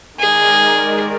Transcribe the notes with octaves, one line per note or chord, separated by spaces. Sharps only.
D#3 G#3 D#4 G#4 A#4 D5